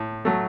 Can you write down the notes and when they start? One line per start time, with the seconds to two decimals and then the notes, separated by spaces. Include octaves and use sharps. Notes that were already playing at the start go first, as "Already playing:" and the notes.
Already playing: A2
0.25 F#3 A3